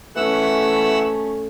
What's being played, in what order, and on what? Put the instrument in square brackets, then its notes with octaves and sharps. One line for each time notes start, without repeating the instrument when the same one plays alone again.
[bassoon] E3 [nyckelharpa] A3 C#4 [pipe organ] F#5 E6